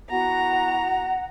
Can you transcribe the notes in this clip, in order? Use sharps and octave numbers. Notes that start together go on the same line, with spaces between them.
B3 E4 F#4 F#5 A#5